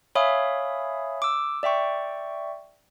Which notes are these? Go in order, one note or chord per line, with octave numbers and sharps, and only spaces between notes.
C#5 E5 F5 G#5 B5 D#6
D6 E6
D5 E5 G5 C#6